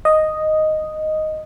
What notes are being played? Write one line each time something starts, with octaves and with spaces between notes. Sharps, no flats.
D#5